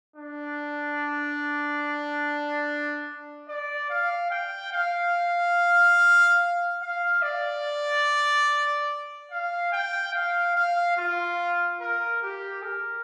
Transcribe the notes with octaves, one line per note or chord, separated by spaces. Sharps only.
D4
D5
F5
G5
F5
F5
D5
F5
G5
F5
F5
F4
A#4
G4
A#4